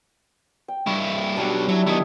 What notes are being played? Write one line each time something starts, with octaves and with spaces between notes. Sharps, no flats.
G5
G2 E4 F5 B5 C#6
B2 F#3 G3 D4 A5
F#3 E4 E5
D#3 B3 E4 D#5